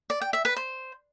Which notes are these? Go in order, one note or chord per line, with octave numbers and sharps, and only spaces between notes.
D5
G5
E5
B4
C5